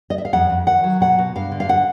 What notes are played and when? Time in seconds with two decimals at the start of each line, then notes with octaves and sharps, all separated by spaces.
0.10 D#5
0.18 E5
0.25 F5
0.33 F2 F#5
0.50 F2
0.67 D#3 F#5
0.84 F#3
1.00 B2 F#5
1.19 B2
1.35 G2 F5
1.52 D3
1.60 F5
1.69 F#5